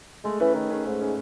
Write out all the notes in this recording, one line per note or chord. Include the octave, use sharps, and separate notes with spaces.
G#3 A3
E3 C#4 G#4 B4
D#3 A3
C#4 G#4 B4
G#2 A3
C#4 G#4 B4